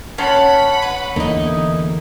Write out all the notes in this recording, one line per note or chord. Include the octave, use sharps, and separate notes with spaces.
C#4 C#5 F#5 A5 B5
B4
E2 D3 A#3 D#4 E4 D#5